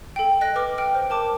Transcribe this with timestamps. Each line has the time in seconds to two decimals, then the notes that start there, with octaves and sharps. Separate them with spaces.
0.16 A4 G5
0.41 D#5 F#6 A#6
0.56 B4 D6 F6
0.78 G5 F6
0.95 C5
1.10 A#4 A5 D6